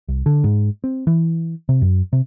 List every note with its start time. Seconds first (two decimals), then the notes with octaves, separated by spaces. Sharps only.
0.08 C2
0.26 D3
0.44 G#2
0.84 C4
1.07 E3
1.69 C3
1.82 F#2
2.13 C3